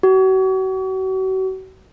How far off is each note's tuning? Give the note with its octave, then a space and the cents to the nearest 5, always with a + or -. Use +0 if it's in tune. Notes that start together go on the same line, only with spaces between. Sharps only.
F#4 +40